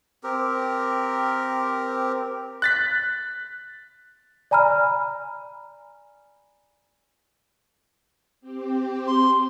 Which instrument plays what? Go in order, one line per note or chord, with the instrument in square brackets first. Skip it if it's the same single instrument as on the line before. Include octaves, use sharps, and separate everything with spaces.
[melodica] C4 G4 A#4
[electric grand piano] F#6 A6 B6
[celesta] D5 G#5 A#5 B5 F6
[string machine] C4 G4
[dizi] C6